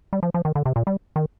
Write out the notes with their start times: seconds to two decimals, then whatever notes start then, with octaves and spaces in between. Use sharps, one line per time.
0.13 G3
0.23 F3
0.34 F3
0.45 D#3
0.55 D3
0.65 C3
0.76 A#2
0.87 G3
1.16 D#3